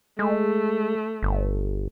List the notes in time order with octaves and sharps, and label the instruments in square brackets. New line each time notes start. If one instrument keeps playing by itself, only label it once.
[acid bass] G#3 [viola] A3
[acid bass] G1